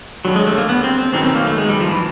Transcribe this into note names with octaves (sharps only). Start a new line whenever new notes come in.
E1 D#2 D3 F#3 G3
G#3
A3
A#3
B3
C4
C4
F#1 F#2 D#3 F#3 B3 C4
C4
A#3
A3
G#3
G3
F3
E3